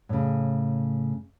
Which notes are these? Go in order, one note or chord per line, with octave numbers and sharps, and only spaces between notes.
A2 C#3